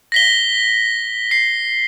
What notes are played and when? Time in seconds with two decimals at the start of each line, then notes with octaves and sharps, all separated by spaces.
0.12 A#6 B6 G7
1.31 C7